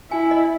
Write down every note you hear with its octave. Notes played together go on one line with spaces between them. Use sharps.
E4 G#5
D#5